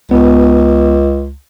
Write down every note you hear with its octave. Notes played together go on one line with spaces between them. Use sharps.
C#2 B3